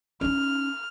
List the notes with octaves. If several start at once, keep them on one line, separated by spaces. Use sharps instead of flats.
C#4 D#4 F6